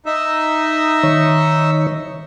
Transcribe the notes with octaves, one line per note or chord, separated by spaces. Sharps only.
D#4 E5
D#3 C#5